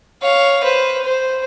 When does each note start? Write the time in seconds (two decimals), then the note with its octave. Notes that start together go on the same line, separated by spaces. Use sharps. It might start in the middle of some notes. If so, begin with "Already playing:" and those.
0.22 C#5 F5
0.63 B4 C5
1.04 C5